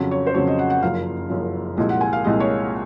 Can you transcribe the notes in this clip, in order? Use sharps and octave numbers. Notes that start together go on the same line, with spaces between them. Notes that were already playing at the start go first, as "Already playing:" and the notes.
Already playing: F2 C#3 F#3
C#5
C5
F2 C#3 F#3 C#5
D#5
F#5
F#5
F#1 F#2 F3 F5
F#1 F#2 F3
C2 A#2 F3 G#3 D#5
F#5
G#5
F5
C2 A#2 F3 G#3 D#5
C#5